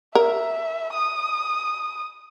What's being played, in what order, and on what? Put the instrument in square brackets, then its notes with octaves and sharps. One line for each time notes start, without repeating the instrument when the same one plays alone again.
[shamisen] A#4 [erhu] E5
[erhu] D#6